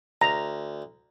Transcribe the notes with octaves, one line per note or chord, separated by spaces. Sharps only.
D2 A#5